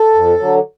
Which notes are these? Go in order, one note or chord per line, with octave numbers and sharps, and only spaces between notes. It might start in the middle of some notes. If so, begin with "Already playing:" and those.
Already playing: A4
F2
D3 F#3